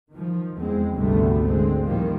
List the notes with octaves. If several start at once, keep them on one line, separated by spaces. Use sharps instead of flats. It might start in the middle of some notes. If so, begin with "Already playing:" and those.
D#3 F3
E2 G#3 C4
G#1 D2 C3 G3 A3 B3
D3 G#3 C4
A2 D#3 F3 G3 A#3